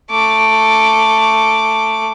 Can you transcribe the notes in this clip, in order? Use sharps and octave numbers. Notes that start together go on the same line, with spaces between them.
A3 D6